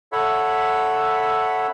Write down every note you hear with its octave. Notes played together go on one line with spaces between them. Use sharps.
A4 C#5 E5 F#5 B5